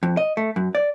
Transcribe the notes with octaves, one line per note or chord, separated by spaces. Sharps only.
F2
D#5
A3
F#2
D5